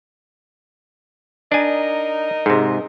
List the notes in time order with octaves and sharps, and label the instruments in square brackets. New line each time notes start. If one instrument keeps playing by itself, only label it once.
[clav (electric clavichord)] D4 G#5 [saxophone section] D#4 A#4 D#5
[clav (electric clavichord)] G#2 C3